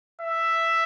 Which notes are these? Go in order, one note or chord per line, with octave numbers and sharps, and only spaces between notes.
E5